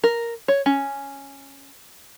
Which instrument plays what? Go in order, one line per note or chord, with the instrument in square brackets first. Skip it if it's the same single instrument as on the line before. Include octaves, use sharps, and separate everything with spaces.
[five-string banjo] A#4
C#5
C#4